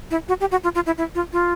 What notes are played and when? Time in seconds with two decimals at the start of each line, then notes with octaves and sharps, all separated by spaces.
0.11 E4
0.28 F#4
0.40 G4
0.51 F#4
0.63 F4
0.75 F4
0.86 E4
0.98 E4
1.15 F4
1.33 F4